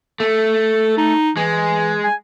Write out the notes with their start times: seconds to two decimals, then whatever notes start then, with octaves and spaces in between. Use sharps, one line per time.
0.20 A3 A4
0.97 D#4
1.37 E3 G#3
2.04 G#5